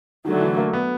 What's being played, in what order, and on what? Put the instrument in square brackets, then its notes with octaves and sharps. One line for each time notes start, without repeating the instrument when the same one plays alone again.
[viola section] D3 F#3 A3 [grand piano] D#3
[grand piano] E3
A#3
B3